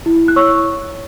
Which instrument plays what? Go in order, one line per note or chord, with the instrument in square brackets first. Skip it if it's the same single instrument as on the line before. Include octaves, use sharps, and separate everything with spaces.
[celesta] E4
F#6
C#5 C#6 E6